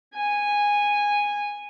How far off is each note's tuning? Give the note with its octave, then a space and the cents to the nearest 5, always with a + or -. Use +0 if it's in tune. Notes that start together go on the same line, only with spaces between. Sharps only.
G#5 -10